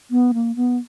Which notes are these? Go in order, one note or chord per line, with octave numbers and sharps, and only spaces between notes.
B3
A#3
B3